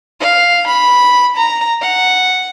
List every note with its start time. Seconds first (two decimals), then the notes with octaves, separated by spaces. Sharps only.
0.20 F5
0.67 B5
1.37 A#5
1.82 F#5